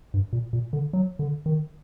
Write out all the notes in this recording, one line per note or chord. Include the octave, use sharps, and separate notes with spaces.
G2
A#2
A#2
D3
F#3
D3
D#3